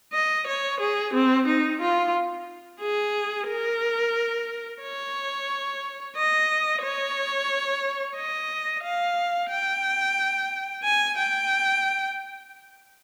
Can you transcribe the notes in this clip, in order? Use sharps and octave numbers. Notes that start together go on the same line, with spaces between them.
D#5
C#5
G#4
C4
D#4
F4
G#4
A#4
C#5
D#5
C#5
D#5
F5
G5
G#5
G5